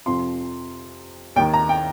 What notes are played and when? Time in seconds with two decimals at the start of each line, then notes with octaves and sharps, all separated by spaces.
0.06 F2 C3 F3 C6
1.36 D#2 G5
1.39 D#3
1.53 A#5
1.69 G5